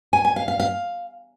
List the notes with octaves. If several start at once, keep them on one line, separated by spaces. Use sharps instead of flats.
G#5
G#5
F5
F5
F5